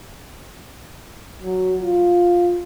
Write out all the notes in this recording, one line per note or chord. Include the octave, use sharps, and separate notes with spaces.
F#3
F4